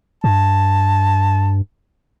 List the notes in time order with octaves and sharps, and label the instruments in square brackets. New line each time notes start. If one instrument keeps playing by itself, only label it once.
[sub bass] G2 [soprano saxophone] A5